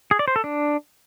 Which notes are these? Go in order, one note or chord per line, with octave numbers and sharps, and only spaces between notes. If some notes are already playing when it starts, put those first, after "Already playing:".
G#4
D5
C5
A4
D4